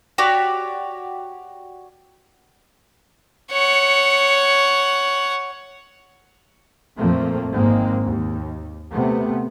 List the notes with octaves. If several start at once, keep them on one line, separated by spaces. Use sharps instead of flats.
F#4 G4 C#5 D5
C#5 F#5
F2 A#2 F3 A3 A#3 C4
G#1 G#2 G#3 A#3 C4
D#2
C3 A3 B3